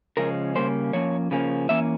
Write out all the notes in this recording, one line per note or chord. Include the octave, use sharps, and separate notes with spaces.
C#3 F3 G#3 C#4 A#4
C#3 G3 A#3 C#4 C5
F3 A#3 C#4 C#5
C#3 F3 A#3 C#4
E3 A#3 C#4 E5